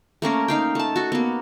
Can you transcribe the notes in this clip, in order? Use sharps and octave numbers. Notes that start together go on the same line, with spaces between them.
A3 A#3 C#4 A#4
D#4 F5 G5
A3 A5
F#4 A4
A#3 B3